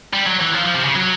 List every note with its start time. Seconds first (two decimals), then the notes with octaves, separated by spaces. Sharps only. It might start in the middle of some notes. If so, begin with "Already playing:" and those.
0.14 G3
0.26 F#3
0.41 E3
0.54 F3
0.65 F3
0.75 C3
0.85 C#3
0.95 F#3